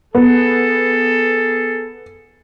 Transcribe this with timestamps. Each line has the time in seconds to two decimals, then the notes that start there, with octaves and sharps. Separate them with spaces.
0.15 B3 G#4 A4